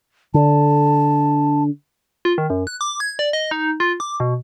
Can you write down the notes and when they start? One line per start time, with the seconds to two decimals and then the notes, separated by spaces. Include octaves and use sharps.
0.34 D3 A5
2.25 F4
2.38 D#3
2.50 F#2
2.67 F#6
2.81 D6
3.00 G#6
3.19 D5
3.33 D#5
3.51 D#4
3.80 F4
4.00 D6
4.20 B2